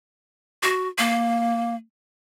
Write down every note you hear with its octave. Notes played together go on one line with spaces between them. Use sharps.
F#4
A#3